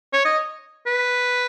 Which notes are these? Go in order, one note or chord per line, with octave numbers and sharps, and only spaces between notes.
C#5
D#5
B4